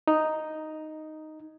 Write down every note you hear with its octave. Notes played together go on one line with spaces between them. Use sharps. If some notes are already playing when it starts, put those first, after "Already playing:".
D#4